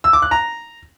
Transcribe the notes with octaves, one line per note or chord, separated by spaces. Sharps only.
E6
D6
F#6
A#5